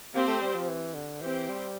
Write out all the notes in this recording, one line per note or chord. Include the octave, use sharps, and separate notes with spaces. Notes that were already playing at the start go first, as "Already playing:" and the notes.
A#3 C4 G4 C5
A3
G3
F3
E3
D3
E3 C4 G4 C5
G3